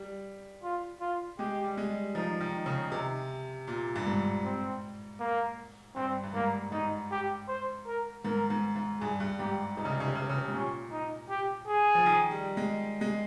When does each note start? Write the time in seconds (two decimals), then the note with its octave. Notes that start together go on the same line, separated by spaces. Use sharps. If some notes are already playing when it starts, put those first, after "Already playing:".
Already playing: G3
0.63 F4
1.01 F4
1.39 G#3 G4
1.64 G3
1.77 G#3
1.90 G3
2.15 F3 D#4
2.40 D#3
2.54 D#4
2.66 C#3
2.92 C3
3.68 A#2
3.96 G2
4.06 G#2
4.44 C4
5.20 A#3
5.96 G2 C4
6.24 G2
6.34 G#2 A#3
6.72 G#2 D#4
7.11 G4
7.48 C5
7.87 A#4
8.25 G#2 A#4
8.50 G#2
8.76 G#2
9.01 G2 G#4
9.20 G2
9.39 G#2 G4
9.77 C3 D#4
9.85 C#3
9.93 C3
10.00 C#3
10.08 C3
10.15 C#3
10.22 C3
10.29 C#3
10.37 C3
10.48 G#2
10.54 A#2 C#4
10.92 D#4
11.29 G4
11.68 G#4
11.95 F3
12.06 D#3
12.31 G3
12.57 G#3
13.01 G#3